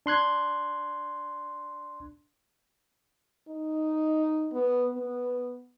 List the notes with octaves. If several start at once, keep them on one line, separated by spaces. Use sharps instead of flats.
D4 C6 F#6 G#6
D#4
B3
B3